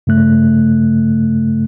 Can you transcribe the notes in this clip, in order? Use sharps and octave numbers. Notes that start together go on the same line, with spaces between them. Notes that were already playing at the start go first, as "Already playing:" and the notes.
G2 C#3 A3 F#6